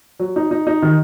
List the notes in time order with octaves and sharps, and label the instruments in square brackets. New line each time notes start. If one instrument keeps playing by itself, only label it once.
[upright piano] F#3
D#4
D#4
D#4
D#3